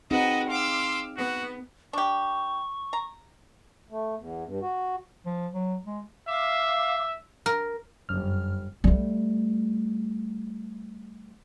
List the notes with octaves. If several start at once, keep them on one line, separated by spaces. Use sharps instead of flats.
C4 D#4 F#4 G#4 B4 D#5
F5 C6 D6 E6
B3 F#4
D4 G4 C#6
A#5
A3
E2
G2
F#4
F3
F#3
G#3
E5 F5 D6
A#4
G1 F#2 F6
G3 A3